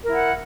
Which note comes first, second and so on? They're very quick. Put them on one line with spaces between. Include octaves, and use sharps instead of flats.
A#4 E4 F#5